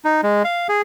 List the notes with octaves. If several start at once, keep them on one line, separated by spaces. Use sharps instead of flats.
D#4
G#3
F5
G#4